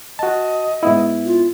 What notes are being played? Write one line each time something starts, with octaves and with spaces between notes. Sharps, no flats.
F#4 D#5 A5
G#2 B3 E4
F4